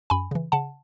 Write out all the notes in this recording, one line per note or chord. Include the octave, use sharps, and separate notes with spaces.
F#2 G#5 B5
C#3 E3
C#3 F#5 A5